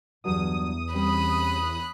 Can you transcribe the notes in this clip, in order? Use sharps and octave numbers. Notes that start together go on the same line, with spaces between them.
E2 G2 F#3 G3 D#6
G3 C4 C#4 B5 F#6